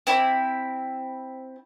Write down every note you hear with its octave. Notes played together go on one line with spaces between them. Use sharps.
C4 E4 D6